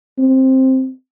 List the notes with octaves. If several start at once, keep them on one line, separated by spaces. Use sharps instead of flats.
C4